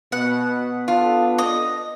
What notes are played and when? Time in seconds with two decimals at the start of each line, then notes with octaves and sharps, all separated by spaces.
0.12 B2 B3 F#5
0.88 D4 F4 A4
1.38 D#5